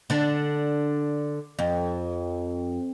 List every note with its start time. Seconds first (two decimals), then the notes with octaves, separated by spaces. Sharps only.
0.10 D3 D4
1.59 F2